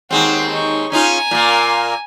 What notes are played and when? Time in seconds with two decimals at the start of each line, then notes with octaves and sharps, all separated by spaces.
0.11 D#2 G#3 C4 F#4
0.50 D#4 C#6
0.92 C#4 D#4 F4 G#5 A#5
1.31 A#2 A#3